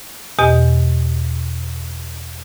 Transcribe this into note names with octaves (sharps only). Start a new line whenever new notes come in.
E2 B2 G4 D#5 G#5